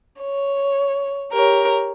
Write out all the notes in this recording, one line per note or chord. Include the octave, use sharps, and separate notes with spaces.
C#5
G4 A#4 C#5